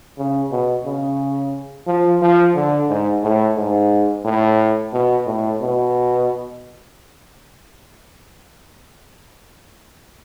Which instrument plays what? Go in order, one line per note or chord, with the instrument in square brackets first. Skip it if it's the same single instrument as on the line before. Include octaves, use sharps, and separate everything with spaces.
[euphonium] C#3
B2
C#3
F3
F3
D3
G#2
A2
G#2
A2
B2
A2
B2